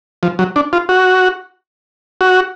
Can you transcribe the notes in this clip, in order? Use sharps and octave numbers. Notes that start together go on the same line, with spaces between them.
F3
F#3
D4
F4
F#4
F#4